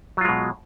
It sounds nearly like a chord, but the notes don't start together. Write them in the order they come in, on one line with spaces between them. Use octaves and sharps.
F#3 F4 G#3 B2